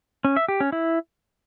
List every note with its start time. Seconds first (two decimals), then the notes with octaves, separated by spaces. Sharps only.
0.25 C#4
0.37 E5
0.48 G4
0.60 C#4
0.72 E4